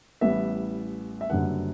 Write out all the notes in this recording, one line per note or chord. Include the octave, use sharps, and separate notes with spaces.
A1 A2 G3 B3 E5
E5
F#1 F#2 D3 G3 B3 F#5